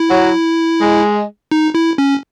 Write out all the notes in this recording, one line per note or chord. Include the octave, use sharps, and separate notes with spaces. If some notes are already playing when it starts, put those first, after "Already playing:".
Already playing: E4
F#3
G#3
D#4
E4
C#4